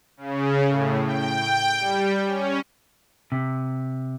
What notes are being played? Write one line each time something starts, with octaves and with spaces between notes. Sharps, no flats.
C#3
A2
G5
G3
C#4
C3